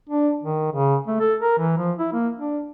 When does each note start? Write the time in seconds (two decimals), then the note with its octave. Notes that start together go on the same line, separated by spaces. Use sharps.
0.09 D4
0.43 D#3
0.72 C#3
1.07 A3
1.20 A4
1.41 A#4
1.58 E3
1.77 F3
1.98 E4
2.13 A#3
2.37 D4